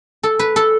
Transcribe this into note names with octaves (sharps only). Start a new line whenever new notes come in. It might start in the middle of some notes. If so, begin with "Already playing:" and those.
A4
B4
A4